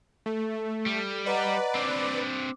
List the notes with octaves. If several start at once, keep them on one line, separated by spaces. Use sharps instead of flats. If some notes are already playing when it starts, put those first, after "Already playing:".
A3 A4
G3
B4 D5 D#5 F#5 A#5
C4 D4 D6